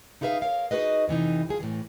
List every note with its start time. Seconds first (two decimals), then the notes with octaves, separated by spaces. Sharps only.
0.21 D#4 E4 G#4 B4 E5 F5
0.41 A#4 C#5 F5
0.71 D#4 F#4 G#4 B4 D#5
1.08 F2 C3 E3 D#4
1.49 F3 G#4
1.60 A2 E3